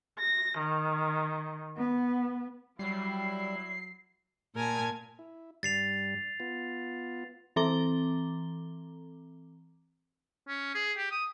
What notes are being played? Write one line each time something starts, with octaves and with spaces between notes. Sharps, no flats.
A#6
D#3
B3
F#3 G3 E4 C7
A#2 A#4 G#5 A5 G#6
E4
G2 G3 A6 C7 F7
B3 F4
E3 C4 A4 A#5 D6 G7
C#4
G#4
G4
D#6